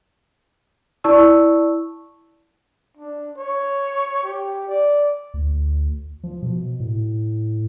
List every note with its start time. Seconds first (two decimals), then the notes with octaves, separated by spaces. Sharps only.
1.04 E4 D5 A5 C#6 E6
2.97 D4
3.37 C#5
4.24 G4
4.68 D5
5.34 D2
6.24 F3
6.43 B2
6.80 A2